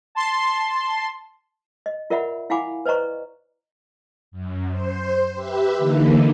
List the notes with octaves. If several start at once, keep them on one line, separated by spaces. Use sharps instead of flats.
A5 C6
D#5
F4 A#4 D5 E5 F#5 B5
E4 F5 F#5 G#5 B5 D6
B4 C5 D5 D#5 A#5 C#6
F#2
C5
G4 B4 E5
D3 E3 A#3 D#4